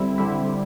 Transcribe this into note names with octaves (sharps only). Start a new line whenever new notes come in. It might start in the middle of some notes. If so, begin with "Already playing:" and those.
Already playing: D3 G3 C4 E4
D3 G3 C4 E4
G3